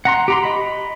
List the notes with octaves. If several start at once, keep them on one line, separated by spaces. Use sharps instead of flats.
F#5 A#5 C6
G4 A#5 C6
D#5 B5